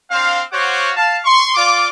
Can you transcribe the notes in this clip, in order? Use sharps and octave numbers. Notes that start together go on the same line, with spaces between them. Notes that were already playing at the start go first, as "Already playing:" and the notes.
C4 D4 C5 F5
F#4 C5 C#5 F5 F#5 D6
F5 A5
C6 C#6
F4 D5 D6